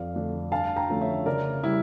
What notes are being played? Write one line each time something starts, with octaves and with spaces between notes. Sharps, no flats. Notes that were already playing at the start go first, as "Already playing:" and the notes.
Already playing: F2 D5 F5
D3 A3 D4
G2 F5 A5
G5 A#5
D3 F3 A3 C#4
C#5 E5
C#3 A#4 D5
G3 E4